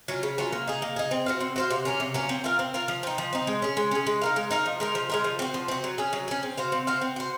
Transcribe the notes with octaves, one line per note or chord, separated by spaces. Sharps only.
F#3 C#4 F4
C#3
F#3 C#4 F4
A#3
D#4 G#4
A#3
D#4 G#4
C4
F#4 C5 F5
C4
F#4 C5 F5
C3
F#3 A#3 C#4
C3
F#3 A#3 C#4
C4
F4 A#4 F5
C4
F4 A#4 F5
F3
C4 D#4
F3
C4 D#4
G#3
C#4 G#4
G#3
C#4 G#4
G#3
D#4 A#4 F5
G#3
D#4 A#4 F5
F3
G#3 D#4 A#4
F3
G#3 D#4 A#4
F3
C4 F#4
F3
C4 F#4
F#3
C#4 G#4
F#3
C#4 G#4
C4
F#4 C5 F5
C4
F#4 C5 F5
C4
F#4 C5